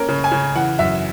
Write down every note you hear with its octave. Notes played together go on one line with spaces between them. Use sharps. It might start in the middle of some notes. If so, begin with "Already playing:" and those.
Already playing: A#3 C#4 A#4
C#3
G#5
C#3
E3 F#5
F#2 E5